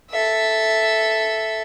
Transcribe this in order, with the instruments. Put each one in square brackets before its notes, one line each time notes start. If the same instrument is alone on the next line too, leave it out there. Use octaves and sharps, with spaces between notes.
[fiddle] A4 E5